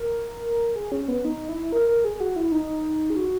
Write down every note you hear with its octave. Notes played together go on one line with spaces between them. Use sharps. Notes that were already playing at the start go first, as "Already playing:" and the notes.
Already playing: A#4
G#4
C#4
B3
D#4
E4
A#4
A#4
G#4
F#4
E4
D#4
G#4
F#4